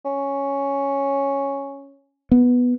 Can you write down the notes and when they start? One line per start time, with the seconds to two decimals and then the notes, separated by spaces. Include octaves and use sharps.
0.05 C#4
2.31 B3